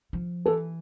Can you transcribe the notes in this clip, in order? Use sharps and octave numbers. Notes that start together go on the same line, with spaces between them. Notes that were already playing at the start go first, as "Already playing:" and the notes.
F3
E3 A4